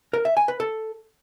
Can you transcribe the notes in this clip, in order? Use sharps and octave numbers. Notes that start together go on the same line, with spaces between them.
A#4
E5
G#5
B4
A4